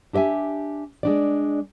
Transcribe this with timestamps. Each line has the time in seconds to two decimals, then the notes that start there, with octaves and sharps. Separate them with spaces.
0.13 D4 G4 D#5 E5 G#5
1.03 G#3 D4 D5